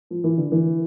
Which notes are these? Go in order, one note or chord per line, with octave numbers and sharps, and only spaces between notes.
F3
E3
D3
E3